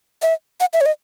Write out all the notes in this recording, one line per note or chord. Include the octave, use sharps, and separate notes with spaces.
E5
F#5
E5
C#5
D#5